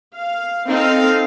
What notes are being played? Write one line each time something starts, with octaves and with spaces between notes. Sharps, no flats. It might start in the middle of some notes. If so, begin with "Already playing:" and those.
F5
C4 D#4 A4 F5